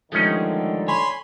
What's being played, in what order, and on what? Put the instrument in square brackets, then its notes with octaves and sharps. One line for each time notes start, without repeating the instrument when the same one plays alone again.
[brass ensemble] G2 D3 D#3 [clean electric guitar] F3 G#3 A3 [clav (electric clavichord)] C#4 D#4
[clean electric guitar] C#5 [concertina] G#5 B5 C6